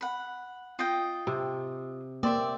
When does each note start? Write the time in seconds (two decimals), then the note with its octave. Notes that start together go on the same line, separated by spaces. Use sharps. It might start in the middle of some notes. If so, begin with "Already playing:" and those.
0.01 F#5 B5
0.79 F4 D#5 G5
1.27 C3
2.23 A#3 C4 D5 E5